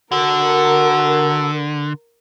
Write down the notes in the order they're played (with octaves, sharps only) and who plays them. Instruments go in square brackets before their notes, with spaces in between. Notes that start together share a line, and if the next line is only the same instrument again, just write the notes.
[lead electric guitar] D3 [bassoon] F#4 [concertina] A4 [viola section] A#4